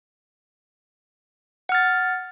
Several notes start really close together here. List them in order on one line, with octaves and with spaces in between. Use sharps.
F#5 F6 A6